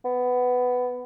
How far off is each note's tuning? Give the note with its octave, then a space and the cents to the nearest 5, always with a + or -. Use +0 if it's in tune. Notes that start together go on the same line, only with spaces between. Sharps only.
B3 +10